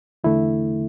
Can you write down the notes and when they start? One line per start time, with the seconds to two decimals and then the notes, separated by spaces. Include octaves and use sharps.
0.24 E2 D3 A3 E4